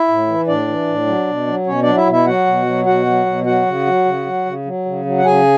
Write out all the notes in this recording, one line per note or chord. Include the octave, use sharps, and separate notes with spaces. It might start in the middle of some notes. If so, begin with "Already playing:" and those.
Already playing: E4 E5
A2
E3
A2 D4 D5
E3
A2
F#3
B2
F#3
B2 C#4 C#5
F#3 D4 D5
E4 E5
B2
E4 E5
F#3 F#4 F#5
B2
F#3
B2 F#4 F#5
F#3
B2
F#3 F#4 F#5
C#3
F#3
C#3
F#3
C#3
F#3
C#3
F#3
F#5
C#3 G#4 G#5